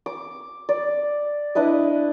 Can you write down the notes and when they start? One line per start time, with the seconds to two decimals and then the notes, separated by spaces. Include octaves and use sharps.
0.06 D6
0.69 D5
1.55 D4 E4 B4 D#5